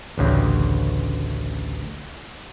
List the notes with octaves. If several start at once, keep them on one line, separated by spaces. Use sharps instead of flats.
A1 D2 C#3